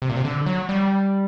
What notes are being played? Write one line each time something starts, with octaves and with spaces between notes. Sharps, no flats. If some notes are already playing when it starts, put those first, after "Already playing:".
C3
A#2
C3
D3
F#3
G3